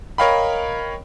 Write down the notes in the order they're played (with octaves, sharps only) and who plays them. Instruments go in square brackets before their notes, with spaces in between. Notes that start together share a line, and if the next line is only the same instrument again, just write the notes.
[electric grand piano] A#4 C#5 D#5 F5 G5 B5